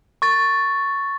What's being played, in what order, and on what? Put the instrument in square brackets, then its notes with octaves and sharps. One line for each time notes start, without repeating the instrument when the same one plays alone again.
[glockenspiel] C#6 A6